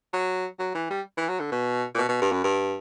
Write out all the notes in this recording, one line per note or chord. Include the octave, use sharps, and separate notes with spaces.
F#3
F#3
E3
G3
E3
F#3
D3
B2
A#2
B2
B2
G2
F#2
G2